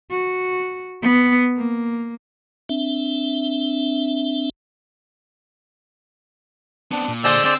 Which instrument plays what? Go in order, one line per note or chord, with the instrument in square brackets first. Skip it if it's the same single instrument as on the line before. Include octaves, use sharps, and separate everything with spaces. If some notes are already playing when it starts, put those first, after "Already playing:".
[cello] F#4
B3
A#3
[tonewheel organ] C4 D4 E5
[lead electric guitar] B3 C4 [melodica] D4
[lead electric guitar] A#2
[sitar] D3 G#3 G#4 [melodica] C5 D5 [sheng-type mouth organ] E6
[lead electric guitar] C4 [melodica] C5 D5